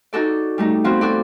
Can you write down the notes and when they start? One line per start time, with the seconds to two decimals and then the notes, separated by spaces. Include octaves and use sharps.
0.13 D#4 F#4 A4 D5
0.58 G3 A3 D#4
0.84 F3 B3 C4 F4 F#4
1.01 F#4 A4 D5